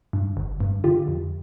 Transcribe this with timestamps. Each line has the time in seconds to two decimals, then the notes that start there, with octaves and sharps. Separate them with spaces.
0.13 G2
0.37 G1
0.60 G2
0.84 D3 F4 G4
1.08 F2